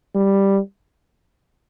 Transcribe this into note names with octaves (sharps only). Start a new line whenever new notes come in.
G3